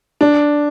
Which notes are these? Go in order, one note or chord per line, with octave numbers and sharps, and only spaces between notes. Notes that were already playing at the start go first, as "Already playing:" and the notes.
D4